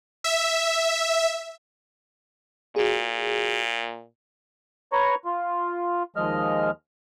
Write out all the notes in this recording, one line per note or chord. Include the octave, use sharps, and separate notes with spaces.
E5
A#2 F#4 G#4
B4 C#5 A#5 C#6
F4
D#2 F3 G#3 D#5 F6